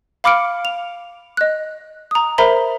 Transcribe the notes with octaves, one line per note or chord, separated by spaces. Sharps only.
F5 B5 D6 F6 C#7 D7
F7
D#5 F#6
A#5 D#6
A#4 C5 E5 A#5 B5